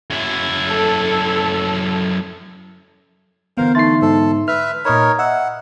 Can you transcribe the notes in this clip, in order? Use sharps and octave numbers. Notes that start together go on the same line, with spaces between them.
F#2 E4
A4
D3 E3 B3 A#4 C5 F5
A3 D#4 E5 C6 A6 C7
G#2 A4
B4 E5 F6
A#2 D#4 A#4 C#5 A#5 B5 D#6
D#5 E5 F#5 E6